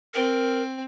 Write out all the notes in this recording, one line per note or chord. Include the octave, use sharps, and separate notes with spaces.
C4 A#4